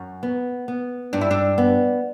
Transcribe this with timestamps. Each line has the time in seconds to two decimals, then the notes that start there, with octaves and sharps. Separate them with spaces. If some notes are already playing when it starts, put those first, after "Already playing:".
Already playing: F#2
0.23 B3
0.68 B3
1.13 G2 D4
1.21 E4
1.31 D4
1.58 B3